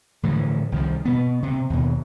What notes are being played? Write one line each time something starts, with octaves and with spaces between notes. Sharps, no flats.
A2 D3 E3 F3
C2 D#3 F3
B2 B3
C3
D#2 B2